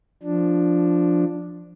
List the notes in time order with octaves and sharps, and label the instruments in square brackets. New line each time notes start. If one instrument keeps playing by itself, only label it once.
[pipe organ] F3 D4